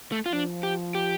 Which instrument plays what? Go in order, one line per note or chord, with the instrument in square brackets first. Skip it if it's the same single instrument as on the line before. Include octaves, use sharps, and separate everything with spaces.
[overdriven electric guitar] A3
F4
[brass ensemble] F3 [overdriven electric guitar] D4
[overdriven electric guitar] G4
G4